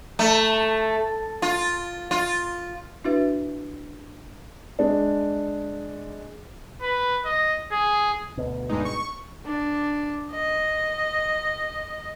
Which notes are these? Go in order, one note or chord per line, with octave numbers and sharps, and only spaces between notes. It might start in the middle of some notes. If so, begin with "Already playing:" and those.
A3
F4
F4
D4 E4 F#4 B4 E5
G#3 D4
B4
D#5
G#4
D2 B2
G2 G#3 D#4
C#6
D4
D#5